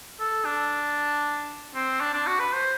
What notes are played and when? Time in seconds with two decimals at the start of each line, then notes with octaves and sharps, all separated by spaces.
0.20 A4
0.45 D4
1.75 C4
2.01 D4
2.14 D4
2.26 F#4
2.40 B4
2.53 C5